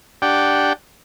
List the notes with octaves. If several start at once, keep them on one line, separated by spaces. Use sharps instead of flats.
D4 G4 F#5 G5